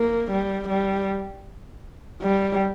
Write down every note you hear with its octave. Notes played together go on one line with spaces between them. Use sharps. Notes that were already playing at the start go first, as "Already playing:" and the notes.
Already playing: A#3
G3
G3
G3